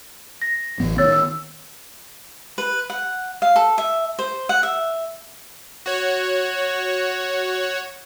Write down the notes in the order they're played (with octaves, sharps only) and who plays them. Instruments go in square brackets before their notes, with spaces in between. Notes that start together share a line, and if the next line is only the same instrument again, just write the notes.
[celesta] A#6
[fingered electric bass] A1 E3 B3
[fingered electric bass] D#3 B3 [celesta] C#5 E6 A6
[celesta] E6
[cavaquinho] B4
F#5
F5
A4
E5
C5
F#5
E5
[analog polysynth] F#4 C#5